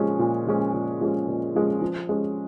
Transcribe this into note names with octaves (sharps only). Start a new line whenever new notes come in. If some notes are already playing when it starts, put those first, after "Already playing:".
Already playing: A#2 F3 G#3 C#4
A#2
F3 G#3 C#4
A#2
F3 G#3 C#4
A#2
F3 G#3 C#4
F3
G#3 C#4